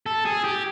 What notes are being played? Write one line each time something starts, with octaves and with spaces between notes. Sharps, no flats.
A4
G#4
G4